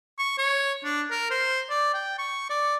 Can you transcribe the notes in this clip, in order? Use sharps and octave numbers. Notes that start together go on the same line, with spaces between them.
C#6
C#5
D4
A#4
C5
D5
G5
C#6
D5